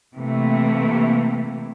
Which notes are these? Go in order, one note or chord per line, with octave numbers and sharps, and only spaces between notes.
C3 E3 A3 A#3